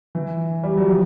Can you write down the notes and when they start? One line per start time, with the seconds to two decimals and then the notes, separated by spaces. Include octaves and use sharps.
0.15 E3
0.63 G3
0.77 F#3
0.89 F3